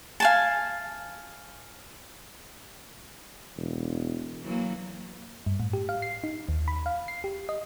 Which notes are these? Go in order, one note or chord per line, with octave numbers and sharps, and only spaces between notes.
F5 G#5 A5
E1
E3 F#3 A#3
G2
A2
G4
F5
C7
D#4
D#2
B5
F5
C7
G4
D#5